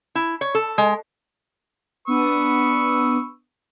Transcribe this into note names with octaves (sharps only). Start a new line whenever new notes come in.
E4
C#5
A4
G#3
B3 D4 B4 C#6 D#6 E6